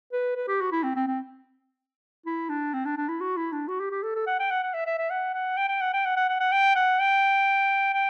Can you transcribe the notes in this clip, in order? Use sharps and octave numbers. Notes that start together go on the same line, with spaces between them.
B4
B4
G4
F#4
E4
C4
C4
C4
E4
D4
C4
D4
D4
E4
F#4
E4
D4
F#4
G4
G4
A4
A4
F#5
G5
F#5
F#5
E5
E5
E5
F#5
F#5
G5
G5
F#5
G5
F#5
F#5
F#5
F#5
G5
F#5
G5
G5